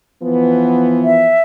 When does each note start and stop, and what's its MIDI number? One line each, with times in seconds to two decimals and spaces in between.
0.23 1.39 52
0.23 1.39 53
0.23 1.39 59
1.05 1.43 76